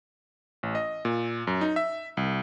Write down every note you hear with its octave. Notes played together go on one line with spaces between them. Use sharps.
A1
D#5
A#2
F#2
D#4
E5
C2